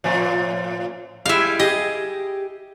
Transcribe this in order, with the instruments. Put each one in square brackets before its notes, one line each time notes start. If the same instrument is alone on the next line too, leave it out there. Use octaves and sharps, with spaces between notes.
[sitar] A2 F3
[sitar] G3 G#3 E4 [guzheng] E5 F5
[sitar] G4 G#4 [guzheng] D#5